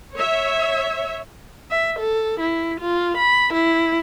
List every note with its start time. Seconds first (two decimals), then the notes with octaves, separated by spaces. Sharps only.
0.16 C#5 E5
1.71 E5
2.00 A4
2.40 E4
2.81 F4
3.18 B5
3.54 E4